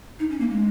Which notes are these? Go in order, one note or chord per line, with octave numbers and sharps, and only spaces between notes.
D#4
C#4
A#3
G#3